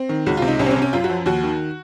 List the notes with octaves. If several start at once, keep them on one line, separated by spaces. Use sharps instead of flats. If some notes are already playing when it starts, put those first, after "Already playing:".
Already playing: C4
D#3
C#2 F#4
C3 F4
D#4
C2 C#4
C4
C#4
C3
C#4
F#2 F4
F#4
F3
D#2 F#4
D#3